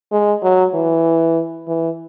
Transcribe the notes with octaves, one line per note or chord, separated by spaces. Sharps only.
G#3
F#3
E3
E3